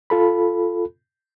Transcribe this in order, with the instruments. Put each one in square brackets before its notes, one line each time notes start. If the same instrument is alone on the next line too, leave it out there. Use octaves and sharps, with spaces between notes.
[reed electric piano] F4 A4 B5